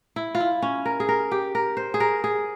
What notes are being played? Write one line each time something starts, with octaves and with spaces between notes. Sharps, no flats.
E4
F4
E4
C#4
A#4
G#4
A#4
G4
A#4
C5
G#4
A#4
G#4